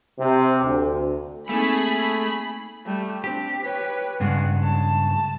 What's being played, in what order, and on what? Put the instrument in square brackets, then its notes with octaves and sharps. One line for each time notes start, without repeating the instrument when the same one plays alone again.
[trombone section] C3
D2
[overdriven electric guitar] A3 [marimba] A#3 C4 D#4 [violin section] G#4 [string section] B5
[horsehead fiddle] G3 A3
[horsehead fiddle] C4 D4 [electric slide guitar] G4
[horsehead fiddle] B4 C#5
[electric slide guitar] G2 C#3 G#3 [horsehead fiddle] F#5
[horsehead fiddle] A5